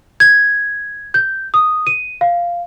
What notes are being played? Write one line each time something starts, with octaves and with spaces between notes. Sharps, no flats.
G#6
G6
D#6
D#7
F5